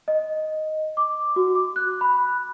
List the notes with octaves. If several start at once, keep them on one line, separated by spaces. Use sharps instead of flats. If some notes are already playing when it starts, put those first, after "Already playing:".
D#5
D6
F#4
D6
F#6
B5